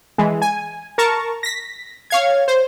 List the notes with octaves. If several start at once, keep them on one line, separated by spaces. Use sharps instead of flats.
E3 G#3
G#5
A#4 A5 A#5 C#6
A#6 B6
C#5 F5 G#6
C5